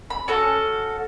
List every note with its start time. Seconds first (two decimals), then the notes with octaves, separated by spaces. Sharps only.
0.10 B5
0.28 C#4 F#4 A4 A5